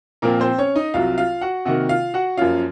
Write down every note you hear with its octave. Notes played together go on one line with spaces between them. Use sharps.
A#2 F3 A#3 C4 A#4
C4 C5
C#4 C#5
D#4 D#5
C2 C3 F#3 F4 F5
F4 F5
F#4 F#5
C3 D#3 A#3 F#4 F#5
F4 F5
F#4 F#5
F#2 F3 A#3 C#4 F4 F5